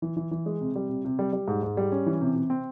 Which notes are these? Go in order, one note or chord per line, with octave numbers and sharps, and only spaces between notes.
E3
E3
E3
G#3
C3
G3
C3
C3
G3
G3
G#2
G#2
G3
C#4
E3
C3
C3
C4